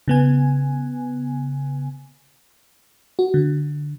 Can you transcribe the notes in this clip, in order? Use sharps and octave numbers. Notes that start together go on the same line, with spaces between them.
C#3 B3 G#5
F#4
D3